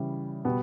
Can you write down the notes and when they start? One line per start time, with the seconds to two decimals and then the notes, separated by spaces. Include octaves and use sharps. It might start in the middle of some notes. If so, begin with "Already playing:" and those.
Already playing: C#3 E3 G3
0.45 B2 G3 B3